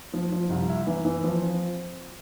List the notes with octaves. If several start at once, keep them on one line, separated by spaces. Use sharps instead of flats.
F3
F3
C2
E4
E3
E3
F3
C4